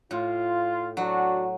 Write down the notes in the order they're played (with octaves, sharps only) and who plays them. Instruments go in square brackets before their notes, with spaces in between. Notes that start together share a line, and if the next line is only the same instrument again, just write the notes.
[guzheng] A2 [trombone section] F4
[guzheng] F#3 [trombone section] D4 F#4